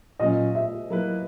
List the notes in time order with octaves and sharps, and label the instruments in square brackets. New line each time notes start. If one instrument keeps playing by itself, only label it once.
[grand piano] A#2 F#3 C#4 [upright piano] D#5
[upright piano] E5
[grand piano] F#3 A#3 E4 B4